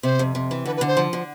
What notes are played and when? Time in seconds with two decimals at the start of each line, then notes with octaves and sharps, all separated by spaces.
0.03 C3 C5
0.19 F2
0.35 C3
0.51 E3
0.66 D3 B4
0.77 B4
0.81 D3
0.87 C5
0.97 F3
1.13 D3